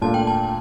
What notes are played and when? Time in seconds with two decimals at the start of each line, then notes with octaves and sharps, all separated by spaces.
0.01 A#2 A3 D4 F4 A5
0.14 G5
0.27 A5